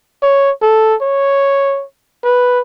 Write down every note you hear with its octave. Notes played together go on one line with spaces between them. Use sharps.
C#5
A4
C#5
B4